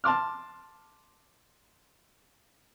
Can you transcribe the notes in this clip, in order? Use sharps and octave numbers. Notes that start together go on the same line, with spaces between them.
A5 C6 D6 F6